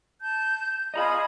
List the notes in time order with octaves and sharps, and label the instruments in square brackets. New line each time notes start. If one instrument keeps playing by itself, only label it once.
[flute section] A5 G6
[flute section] F4 G#4 D#6 [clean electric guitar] D#5 A#5 B5